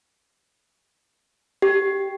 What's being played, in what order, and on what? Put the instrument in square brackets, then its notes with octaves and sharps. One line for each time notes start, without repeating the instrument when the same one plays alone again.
[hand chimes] G4